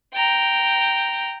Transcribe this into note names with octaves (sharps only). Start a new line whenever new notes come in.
G5 A#5